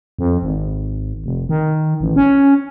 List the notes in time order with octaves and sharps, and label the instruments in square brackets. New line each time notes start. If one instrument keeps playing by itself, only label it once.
[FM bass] F2
G#1
F1
D#3
A1
C#4